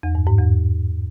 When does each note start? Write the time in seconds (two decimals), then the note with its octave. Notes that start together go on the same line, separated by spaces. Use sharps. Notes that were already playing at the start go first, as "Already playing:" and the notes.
0.03 E2
0.15 G2
0.27 G#2
0.39 E2